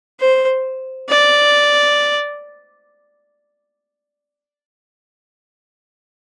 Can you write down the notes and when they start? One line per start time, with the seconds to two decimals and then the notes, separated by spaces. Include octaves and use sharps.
0.20 C5
1.09 D5